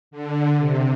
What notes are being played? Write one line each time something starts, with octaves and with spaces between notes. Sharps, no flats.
D3
C3